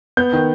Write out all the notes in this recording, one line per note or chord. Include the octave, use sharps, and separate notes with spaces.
B3 G6
D#3